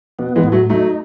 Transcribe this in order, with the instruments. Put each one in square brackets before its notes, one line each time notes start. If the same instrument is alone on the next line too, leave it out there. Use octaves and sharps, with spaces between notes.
[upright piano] B2 [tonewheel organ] B3
[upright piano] E3 G#3
[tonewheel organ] A2
[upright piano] F#3 A3
[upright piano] F#3 A3 [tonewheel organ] D#4